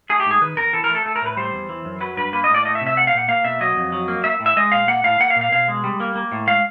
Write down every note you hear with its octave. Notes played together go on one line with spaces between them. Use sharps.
A3 G#4
G4
G#2
G#4
D#3 B4
E2 A#4
E3 A4
A#4
A3
A4
A3 A4
A#4
A2 B4
G3 C5
E2
E3
F#2
F#3 B4
G2 B4
A#3 B4
D#5
A2
D5
A3 D#5
E5
C3
E5
A3 F#5
F5
A#2 F#5
A#3 F5
B2 E5
F#3 D#5
F2
F#3
A#3
A#3 E5
A2
E5
G#3 D#5
A#2 F5
A#3 F#5
A2 F5
A#3 F#5
F5
A#2
F5
B2 F5
G#3
G3
A#3
A#3
A2
G#3 F5